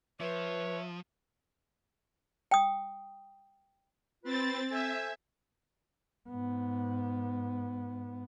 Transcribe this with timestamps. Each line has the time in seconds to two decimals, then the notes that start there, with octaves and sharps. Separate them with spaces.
0.21 F3 B4 C#5 E5
2.51 G5 D#6
4.24 C4 F4 B4 A6
4.70 A4 C5 E5 G#5
6.29 G#2 B3